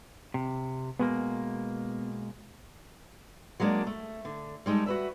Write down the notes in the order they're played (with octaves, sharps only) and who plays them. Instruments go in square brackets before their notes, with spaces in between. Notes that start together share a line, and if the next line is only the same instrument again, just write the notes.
[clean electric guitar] C3
[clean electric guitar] B2 G#3 A#3 [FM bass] B3
[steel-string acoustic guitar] F#3 G#3 A#3 C#4 D4
A3
D3
G3 G#3 D#4 A4
F#4 B4 E5